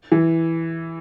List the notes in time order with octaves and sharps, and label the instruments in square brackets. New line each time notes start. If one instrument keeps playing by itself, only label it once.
[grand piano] E3